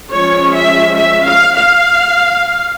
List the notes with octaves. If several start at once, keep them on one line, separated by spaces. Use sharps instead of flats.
F3 G#3 C#4 C#5
E5
E5
F5
F5